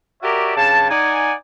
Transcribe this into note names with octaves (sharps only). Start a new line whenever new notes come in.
F#4 G4 A#4 C#5 D5 E5
G2 C#3 G4 A5
D#4 D5 F#5 G#5